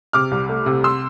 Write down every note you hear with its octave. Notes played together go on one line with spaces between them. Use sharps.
C3 D6 F6
C2
A3
C3
C6 E6